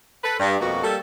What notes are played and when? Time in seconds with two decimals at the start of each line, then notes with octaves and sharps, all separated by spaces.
0.24 A4 B4
0.40 G2
0.60 F2 B2 A#3 F#4
0.84 G3 A#3 A4